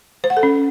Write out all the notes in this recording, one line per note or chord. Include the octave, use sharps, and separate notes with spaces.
C5
F#5
A4
C#4